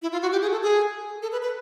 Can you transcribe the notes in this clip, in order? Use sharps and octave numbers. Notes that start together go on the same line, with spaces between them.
E4
F4
F#4
G4
G#4
A4
G#4
A4
B4
B4